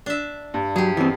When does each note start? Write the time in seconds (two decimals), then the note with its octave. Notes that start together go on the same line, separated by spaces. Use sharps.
0.06 D4 E5
0.54 G2
0.76 F#3 G4 G#4
0.97 E3 B3 C4